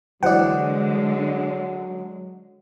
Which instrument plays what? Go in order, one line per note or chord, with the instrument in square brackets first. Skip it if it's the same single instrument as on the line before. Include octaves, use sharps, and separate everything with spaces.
[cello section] D3 G#3 [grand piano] E3 F#4 C5 [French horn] F#3 [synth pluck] D5 F#5